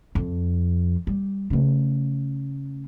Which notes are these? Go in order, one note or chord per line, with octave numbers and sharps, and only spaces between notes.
F2
G3
C#3 A3